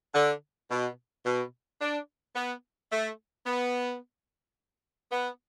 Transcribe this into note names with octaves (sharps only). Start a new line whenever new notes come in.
D3
B2
B2
D4
B3
A3
B3
B3